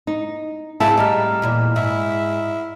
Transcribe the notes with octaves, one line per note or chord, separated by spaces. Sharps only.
D#4
G#2 C4 E4 G#4 F5 A5
A2 G3 D#5 A#5 F6
E2 A#2 E4
G#2 E4